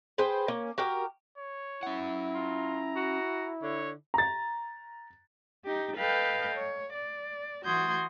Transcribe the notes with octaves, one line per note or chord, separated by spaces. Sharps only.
G#4 B4 C5 G5
A#3 C#4
F#4 G4 A#4 G5
C#5
C#4 E4 F#5
F4 A#5
F#4
D3 C#5
A#5 A6
D#4 G4
A4 B4 D#5 F5 G5 G6
C#5
D5
E3 F#4 C6 D#6 G6 G#6